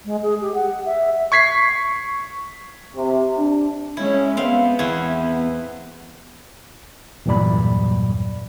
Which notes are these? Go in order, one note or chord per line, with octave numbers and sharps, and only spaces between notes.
G#3
G#4
G4
F#5
E5
C#6 G#6 B6 C7
C3
D4
G#3 C#4 E4
B3 C4 F5
E2 E4
E2 G2 A#2 F#3 D5 B5